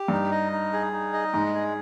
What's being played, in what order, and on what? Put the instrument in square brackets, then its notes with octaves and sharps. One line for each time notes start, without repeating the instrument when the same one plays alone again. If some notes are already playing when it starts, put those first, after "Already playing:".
Already playing: [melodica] G4
[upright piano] G2 [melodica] D#4
[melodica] D#5
D#4
G#4
D#4
D#5
[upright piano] G#2 [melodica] G#3
[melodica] G#4